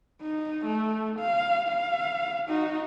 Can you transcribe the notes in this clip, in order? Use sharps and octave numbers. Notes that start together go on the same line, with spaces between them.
D#4
A3
F5
F5
D#4 F#4